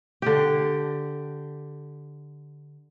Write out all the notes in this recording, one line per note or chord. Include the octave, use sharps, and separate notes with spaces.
D3 G4